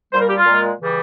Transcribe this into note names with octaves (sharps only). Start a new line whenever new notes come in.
A#2 G3 C5
A#4
G4
F4
A#2 G#3
C#3 E3 G3